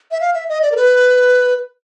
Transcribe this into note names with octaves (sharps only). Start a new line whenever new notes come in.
E5
F5
E5
D#5
D5
A#4
B4